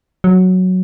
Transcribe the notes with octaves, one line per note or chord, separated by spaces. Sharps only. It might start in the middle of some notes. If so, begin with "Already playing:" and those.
F#3